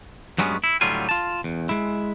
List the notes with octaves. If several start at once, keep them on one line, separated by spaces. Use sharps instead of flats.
G2 F#3 G#3 B3 C#4
E4
A2 D3 F#3 G3 F4 G#5
F4 A5
E2
G#3 E4